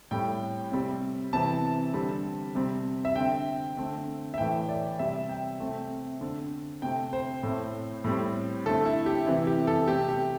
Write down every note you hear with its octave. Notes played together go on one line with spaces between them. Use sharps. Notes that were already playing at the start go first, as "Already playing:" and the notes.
A2 G3 C4 G5
C3 G3 C4
C3 E3 C4 A5
D3 G3 C4
C3 G3 C4
E5
D3 C4 G5
D3 A3 C4
E5
A2 E3 A3 G5
D5
C3 G3 C4 E5
G5
C3 A3 C4
D3 C4
C3 A3 C4 G5
C5
A2 A3 C4
A2 G3 C4
D3 A3 C4 A4
E4
G4
C3 E3 C4 E4
G4
A4
C3 A3 C4 G4
G4